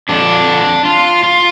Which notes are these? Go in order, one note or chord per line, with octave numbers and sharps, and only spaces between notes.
F2 D3 D4
F4
F4